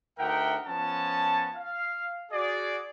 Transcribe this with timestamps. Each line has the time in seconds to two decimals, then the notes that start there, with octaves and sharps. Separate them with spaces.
0.18 D2 D#4 A#4 E5 F#5 G5
0.67 F3 B3 C#4 A5
1.56 F5
2.31 F#4 G#4 D5